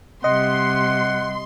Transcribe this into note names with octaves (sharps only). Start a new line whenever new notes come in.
C3 G3 D#5 F#5 C6